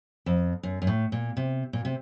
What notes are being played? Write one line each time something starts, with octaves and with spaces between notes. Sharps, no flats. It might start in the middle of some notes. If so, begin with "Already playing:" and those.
F2
F#2
F#2
A2
A#2
C3
A#2
C3